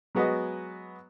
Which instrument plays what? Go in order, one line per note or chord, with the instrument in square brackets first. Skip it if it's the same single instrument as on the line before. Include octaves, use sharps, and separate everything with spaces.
[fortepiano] F#3 G#3 B3 F#4 B4 D#5